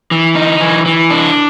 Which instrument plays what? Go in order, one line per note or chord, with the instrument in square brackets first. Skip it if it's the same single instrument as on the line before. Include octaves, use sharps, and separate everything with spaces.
[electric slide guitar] E3
D#4
E3
E3
D4